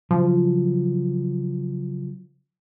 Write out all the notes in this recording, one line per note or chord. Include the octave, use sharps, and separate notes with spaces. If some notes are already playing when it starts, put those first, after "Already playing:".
C#3 F3 F#3